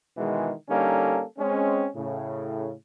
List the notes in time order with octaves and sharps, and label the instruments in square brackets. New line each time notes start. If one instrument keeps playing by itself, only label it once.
[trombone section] B2 D#3 E3 G#3
D3 G3 A#3 C#4 D#4 A4
G#3 C4 C#4
A2 C#3